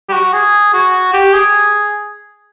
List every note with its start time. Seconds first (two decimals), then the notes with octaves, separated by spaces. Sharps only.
0.09 G4
0.13 F#4
0.33 G#4
0.73 F#4
1.14 G4
1.33 G#4